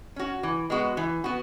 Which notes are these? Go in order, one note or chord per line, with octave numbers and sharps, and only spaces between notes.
C#4 F#4
E3
G#3 B3 F#4
E3
B3 F#4